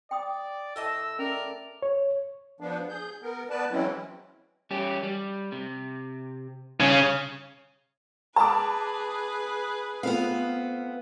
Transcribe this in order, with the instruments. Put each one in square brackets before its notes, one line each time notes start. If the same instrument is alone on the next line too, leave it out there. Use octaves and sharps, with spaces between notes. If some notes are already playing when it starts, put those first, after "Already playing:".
[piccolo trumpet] D5 [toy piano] G5 C6 D#6
[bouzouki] A2 D#5 A5 [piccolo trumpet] E6
[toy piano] C#4 [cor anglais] A#4 [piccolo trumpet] D5
[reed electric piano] C#5
[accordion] F3 B3 D4
G#4 G6
B3 A#4
B3 B4 D5 A5
E3 F#3 G#3 C4 C#4 E4
[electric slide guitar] G3 C#4 G4
G3
C3
[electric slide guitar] G2 [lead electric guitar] C#3
[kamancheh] G#4 B4 [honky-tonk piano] A5 B5 D6
[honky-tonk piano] A3 C4 F4 [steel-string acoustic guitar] B3 F5